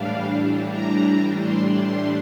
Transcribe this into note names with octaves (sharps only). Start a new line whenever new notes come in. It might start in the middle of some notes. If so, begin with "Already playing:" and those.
Already playing: A2 E3 G3 D4 F5
A#5
C6
C6